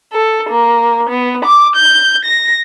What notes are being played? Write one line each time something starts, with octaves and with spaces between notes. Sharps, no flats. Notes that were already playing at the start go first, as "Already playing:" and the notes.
A4
A#3
B3
D6
G6
A#6